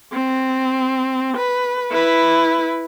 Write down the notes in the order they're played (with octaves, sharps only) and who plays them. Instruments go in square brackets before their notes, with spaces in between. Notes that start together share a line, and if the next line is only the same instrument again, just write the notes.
[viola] C4
B4
E4 B4